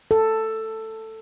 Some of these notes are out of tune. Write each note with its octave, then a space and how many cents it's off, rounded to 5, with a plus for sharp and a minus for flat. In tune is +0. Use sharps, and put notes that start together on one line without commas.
A4 +10